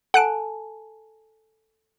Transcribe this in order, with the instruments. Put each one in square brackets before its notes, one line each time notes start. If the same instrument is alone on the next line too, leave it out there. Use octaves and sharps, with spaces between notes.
[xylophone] A4 G#5 A5 [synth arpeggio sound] F#5 F#6 D7